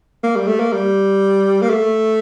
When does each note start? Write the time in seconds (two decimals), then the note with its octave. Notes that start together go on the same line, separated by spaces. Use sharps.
0.23 A#3
0.36 G3
0.47 A3
0.60 A#3
0.73 G3
1.62 A#3
1.70 A3